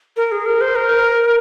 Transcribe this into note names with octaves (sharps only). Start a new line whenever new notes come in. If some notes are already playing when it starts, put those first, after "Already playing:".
A#4
G#4
A#4
C5
A#4